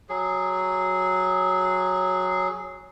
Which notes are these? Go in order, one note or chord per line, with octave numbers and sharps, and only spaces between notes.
F#3 G#4